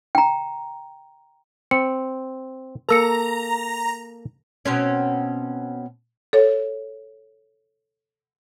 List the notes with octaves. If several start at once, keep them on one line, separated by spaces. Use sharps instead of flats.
G5 A#5
C4 C#7
A#3 A4 A#4 A#5 E6 C#7
B2 C4 C#4
A4 C#5